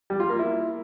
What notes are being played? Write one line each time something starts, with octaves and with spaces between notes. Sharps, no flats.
G3
F4
A#3
E4